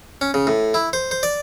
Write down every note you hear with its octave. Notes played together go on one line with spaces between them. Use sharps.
C#4
C#3
A2
E4
C5
C5
D5